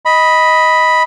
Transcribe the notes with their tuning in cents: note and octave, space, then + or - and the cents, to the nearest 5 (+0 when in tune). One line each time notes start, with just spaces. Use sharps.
D#5 +10 B5 -5